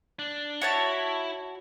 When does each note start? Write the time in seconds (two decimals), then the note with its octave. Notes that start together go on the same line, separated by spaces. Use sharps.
0.19 D4
0.62 E4 F#4 C#5 E5 A5